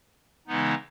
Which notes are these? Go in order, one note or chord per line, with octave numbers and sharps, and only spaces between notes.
C#3 E3 G#3 B3 D#4